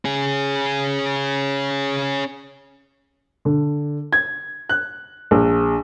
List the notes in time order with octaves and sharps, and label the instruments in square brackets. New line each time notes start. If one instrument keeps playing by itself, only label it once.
[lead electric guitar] C#4 G#4
[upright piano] D3
G#6
F#6
A#1